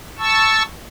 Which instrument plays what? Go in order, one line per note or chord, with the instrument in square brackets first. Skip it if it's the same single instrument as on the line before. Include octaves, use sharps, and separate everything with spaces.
[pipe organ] A5 C#6 E6